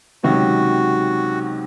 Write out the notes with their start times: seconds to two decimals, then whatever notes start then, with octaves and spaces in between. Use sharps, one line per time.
0.24 C#2 C3 D#3 F#3 F#4